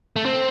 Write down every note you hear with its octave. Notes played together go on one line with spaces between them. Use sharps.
A3
C4